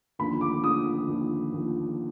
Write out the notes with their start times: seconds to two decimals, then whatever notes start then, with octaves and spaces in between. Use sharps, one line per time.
0.19 D#2 D3 F3 B5
0.41 D6
0.63 D#2 D3 F3 D#6
1.08 D#2 D3 F3
1.52 D#2 D3 F3